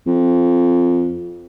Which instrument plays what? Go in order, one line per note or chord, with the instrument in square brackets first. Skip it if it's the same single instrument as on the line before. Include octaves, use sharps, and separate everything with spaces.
[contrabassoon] F2